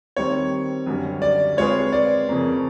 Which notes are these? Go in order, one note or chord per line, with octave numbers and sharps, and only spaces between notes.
D#3 G3 C4 C#5
F#2 D3 G3
D5
G#3 C4 F4 G#4 B4 C#5
D5
F2 C#3 F3 A#3 C#4